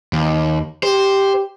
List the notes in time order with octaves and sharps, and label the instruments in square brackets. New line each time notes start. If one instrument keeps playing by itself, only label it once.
[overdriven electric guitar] D#2
[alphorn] G4 [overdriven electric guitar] C5